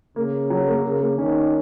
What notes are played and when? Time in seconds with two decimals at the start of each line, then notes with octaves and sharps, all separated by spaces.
0.16 C#3 A#3
0.50 F#3
0.67 A#3
0.84 C#3
1.01 A#3
1.18 D#3 C#4